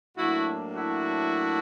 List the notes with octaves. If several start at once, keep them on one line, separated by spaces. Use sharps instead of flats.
A2 F#3 A#3 D4 E4 F#4
E4 F#4